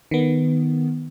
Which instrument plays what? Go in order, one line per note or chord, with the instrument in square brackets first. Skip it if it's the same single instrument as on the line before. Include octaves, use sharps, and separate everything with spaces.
[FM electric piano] D#3 B3